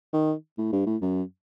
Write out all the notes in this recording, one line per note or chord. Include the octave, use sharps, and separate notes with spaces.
D#3
A2
G2
A2
F#2